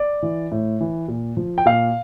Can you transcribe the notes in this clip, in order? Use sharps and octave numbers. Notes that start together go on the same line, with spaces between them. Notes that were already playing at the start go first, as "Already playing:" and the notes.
Already playing: D5
E3
A2
E3
A#2
F3
G5
A#2 F5